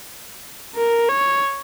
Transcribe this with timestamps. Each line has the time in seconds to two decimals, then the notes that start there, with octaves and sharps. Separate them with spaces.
0.76 A#4
1.09 C#5